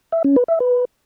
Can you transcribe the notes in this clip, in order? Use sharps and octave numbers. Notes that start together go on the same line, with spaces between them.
E5
C#4
B4
E5
B4